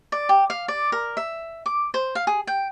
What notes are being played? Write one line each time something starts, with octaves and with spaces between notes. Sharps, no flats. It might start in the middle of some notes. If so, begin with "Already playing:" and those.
D5
G4
F5
D5
A#4
E5
D6
C5
F5
G#4
G5